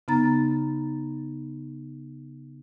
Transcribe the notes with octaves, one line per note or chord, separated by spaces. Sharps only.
C#3 B3 D#4 A#5 A6